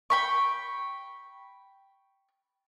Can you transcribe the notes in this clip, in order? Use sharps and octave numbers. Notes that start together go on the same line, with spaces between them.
G5 B5 C#6